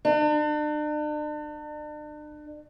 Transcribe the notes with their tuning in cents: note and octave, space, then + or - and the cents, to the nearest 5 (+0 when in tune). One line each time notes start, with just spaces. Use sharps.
D4 +40